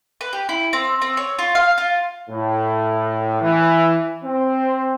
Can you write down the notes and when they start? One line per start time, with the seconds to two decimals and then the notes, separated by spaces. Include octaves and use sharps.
0.21 B4
0.33 G4
0.49 E4
0.73 C4
1.02 C4
1.17 C#5
1.39 F4
1.55 F5
1.78 F4
2.30 A2
3.42 E3
4.23 C4